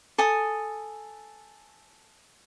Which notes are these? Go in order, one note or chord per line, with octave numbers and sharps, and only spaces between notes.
A4 G#5 D#6